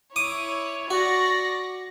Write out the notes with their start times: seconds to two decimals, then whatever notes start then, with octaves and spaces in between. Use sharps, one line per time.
0.16 E4 C#5 D6 D#6
0.90 F#4 D5 C#6 A#6